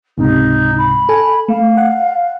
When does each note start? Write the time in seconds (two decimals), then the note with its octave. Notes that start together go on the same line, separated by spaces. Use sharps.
0.18 C#2 G#2 C3 D#4
0.78 B5
1.09 A4 G#5
1.48 A3 F5
1.77 F#5